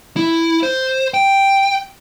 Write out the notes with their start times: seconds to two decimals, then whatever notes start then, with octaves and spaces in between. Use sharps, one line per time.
0.17 E4
0.63 C5
1.14 G5